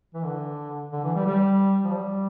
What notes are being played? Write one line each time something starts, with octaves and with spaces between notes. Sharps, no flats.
E3
D3
D3
E3
G3
G3
F3
G3